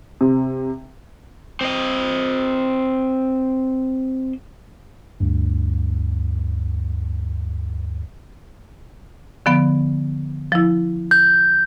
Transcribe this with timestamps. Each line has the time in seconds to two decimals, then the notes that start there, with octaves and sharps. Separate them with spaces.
0.21 C3
1.61 C4 D#5
5.20 D2 G2
9.46 D3 F3 B3
10.52 F3 E4
11.11 G6